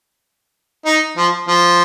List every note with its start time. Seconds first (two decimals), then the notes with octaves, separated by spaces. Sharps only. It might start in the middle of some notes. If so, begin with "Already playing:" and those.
0.86 D#4
1.17 F3
1.48 F3